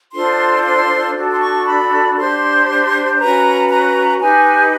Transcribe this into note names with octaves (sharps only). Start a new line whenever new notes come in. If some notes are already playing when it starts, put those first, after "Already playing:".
D4 F4 A4 C5 C6
C6
D4 F#4 A4
C6
C#6
B5
D4 G4 C5 C6
C#4 F#4 B4 A#5
A#5
D#4 G4 B4 G#5